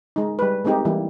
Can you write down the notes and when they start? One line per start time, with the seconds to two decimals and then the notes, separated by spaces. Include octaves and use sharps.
0.16 G#3 D#4
0.39 G3 B4
0.65 G#3 A3 C4 D#4 G4
0.85 E3 G3 A#3 E4